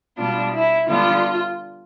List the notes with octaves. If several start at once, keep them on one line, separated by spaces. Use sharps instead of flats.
B2 G3 B3 D4 F4
E4
D3 G3 B3 D4 F4